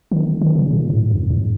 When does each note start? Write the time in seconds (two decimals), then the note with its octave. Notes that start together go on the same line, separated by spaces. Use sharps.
0.11 D#3
0.41 D#3
0.55 C#3
0.71 A#2
0.90 G#2
1.11 F2
1.30 G#2